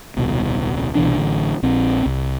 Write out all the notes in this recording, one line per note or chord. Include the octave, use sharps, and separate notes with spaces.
D#1 C2 B2
C2 B2 E3 D4
A1 D3
A#1 C4
C2